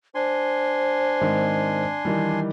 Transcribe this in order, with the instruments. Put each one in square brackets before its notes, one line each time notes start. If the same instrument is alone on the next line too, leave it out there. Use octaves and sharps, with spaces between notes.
[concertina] D4 G#5 C6 [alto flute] C5
[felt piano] G#2 D#3 C4
D#3 E3 G3